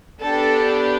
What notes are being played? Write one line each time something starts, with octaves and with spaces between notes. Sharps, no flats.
B3 D4 G4 A4